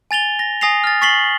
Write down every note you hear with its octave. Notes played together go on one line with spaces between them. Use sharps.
G#5 A6 F7 G7
A#6
G#5 D#6 A#6 C7 F7
F6 A6
C#6 A6 B6 C7 F#7 G7